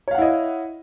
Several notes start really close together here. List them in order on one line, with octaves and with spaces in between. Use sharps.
C#5 F5 F#5 E4 D#5